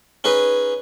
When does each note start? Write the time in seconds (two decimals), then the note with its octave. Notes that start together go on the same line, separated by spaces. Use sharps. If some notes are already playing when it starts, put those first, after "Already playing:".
0.24 C#4 D#4 G#4 B4